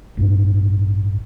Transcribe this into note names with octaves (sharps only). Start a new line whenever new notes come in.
A1 G2